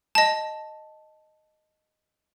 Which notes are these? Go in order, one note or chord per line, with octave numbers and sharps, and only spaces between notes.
D#5 A5